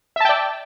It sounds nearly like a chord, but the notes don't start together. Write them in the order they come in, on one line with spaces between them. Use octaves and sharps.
E5 A5 G5 D5